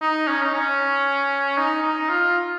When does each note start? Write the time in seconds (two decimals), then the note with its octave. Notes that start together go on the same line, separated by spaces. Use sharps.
0.01 D#4
0.27 C#4
0.42 D#4
0.53 C#4
1.57 D#4
1.82 D#4
2.09 F4